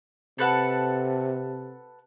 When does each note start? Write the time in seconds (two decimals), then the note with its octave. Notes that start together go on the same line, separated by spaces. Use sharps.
0.39 C3 A4 B4 F#5